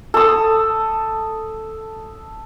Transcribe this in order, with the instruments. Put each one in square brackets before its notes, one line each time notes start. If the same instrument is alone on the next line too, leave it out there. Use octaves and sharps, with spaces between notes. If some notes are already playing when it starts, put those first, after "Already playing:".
[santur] A4 D#6